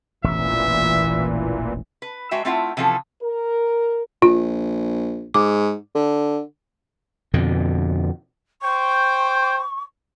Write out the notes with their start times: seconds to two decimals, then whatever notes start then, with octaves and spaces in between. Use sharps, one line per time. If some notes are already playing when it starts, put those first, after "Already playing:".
0.24 E1 A1 A#2 C#3 E3 E5
2.02 B4
2.31 G#3 F#4 E5 G5
2.45 A3 C4 E4 F4 E5 F#5
2.77 C3 E3 F3 C#4 A4
3.22 A#4
4.22 A#1 F4
5.34 G#2 D6
5.95 D3
7.34 F2 B2 D3
8.62 C5 G5 C#6